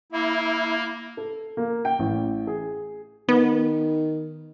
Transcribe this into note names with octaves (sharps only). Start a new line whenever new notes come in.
A#3 E4
A4
A#3
G5
A1
G#4
D#3 B3